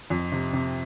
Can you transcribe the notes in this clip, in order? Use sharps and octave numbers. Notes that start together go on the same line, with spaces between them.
F2
C3
C3